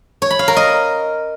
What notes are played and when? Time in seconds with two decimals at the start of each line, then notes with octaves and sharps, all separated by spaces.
0.22 C#5
0.30 B5
0.39 F5
0.48 A#4
0.56 D#5